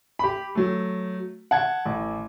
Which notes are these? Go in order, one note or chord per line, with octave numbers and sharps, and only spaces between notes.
G4 B5
F#3 A3
F#5 A5 G#6
A1